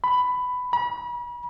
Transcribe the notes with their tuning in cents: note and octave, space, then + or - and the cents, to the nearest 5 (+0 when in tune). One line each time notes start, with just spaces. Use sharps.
B5 +10
B5 -40